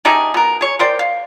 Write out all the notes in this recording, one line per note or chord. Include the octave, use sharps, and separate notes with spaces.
A3 D#4 G4 G#4
B2 A#4
G#4 C#5
A#4 C5 D5 G5
F5